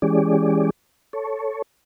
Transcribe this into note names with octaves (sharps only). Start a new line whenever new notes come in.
E3 G#3 C#4 G4 G#4 D5
A4 C#5